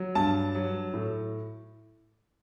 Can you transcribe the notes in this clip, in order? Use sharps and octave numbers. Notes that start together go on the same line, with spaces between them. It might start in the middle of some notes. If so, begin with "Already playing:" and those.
Already playing: F#3
G2 A5
F#3
A2